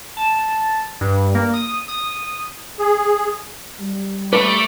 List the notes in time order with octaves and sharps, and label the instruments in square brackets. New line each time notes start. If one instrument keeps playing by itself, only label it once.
[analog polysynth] A5
G2
A#3
D#6
D#6
[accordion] G#4
[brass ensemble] G3
[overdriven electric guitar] A3 [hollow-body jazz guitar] B4 B5 [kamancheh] D6